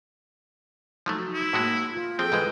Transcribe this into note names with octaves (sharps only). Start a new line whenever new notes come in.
F3 F#3 A3 D#4 F#4
E4
A2 G#3 A#3 F#4 E6
F4
F3 C4 G#4 A4 G5
G#2 E3 G#3 B4 D#5